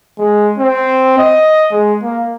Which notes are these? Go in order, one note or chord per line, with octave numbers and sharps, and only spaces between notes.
G#3
C4
D#5
G#3
A#3